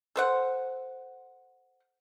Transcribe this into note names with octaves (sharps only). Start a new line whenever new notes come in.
A4 C5 F#5